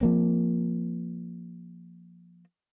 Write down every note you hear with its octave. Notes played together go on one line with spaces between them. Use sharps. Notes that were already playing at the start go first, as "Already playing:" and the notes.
F3 A#3 C4